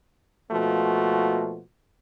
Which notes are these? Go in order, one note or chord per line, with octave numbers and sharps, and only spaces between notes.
B2 F3 A3 A#3 F4 F#4